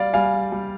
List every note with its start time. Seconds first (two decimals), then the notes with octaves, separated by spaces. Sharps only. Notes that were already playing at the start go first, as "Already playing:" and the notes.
Already playing: G3 D5 F5
0.13 G3 F5 G#5
0.52 G3